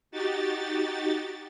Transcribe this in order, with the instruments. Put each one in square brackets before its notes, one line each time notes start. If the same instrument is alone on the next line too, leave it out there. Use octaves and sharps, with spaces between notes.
[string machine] D#4 F#4 G4 A6